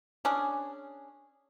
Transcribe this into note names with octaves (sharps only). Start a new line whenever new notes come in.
C#4 D4 G#4